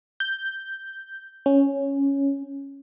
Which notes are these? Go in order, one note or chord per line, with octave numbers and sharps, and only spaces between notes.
G6
C#4